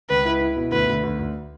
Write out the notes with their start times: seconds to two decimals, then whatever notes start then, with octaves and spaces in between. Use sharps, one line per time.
0.10 C#2 B4
0.25 E4
0.41 E4
0.56 B2
0.72 D2 B4
0.87 D2
1.03 D2
1.19 D2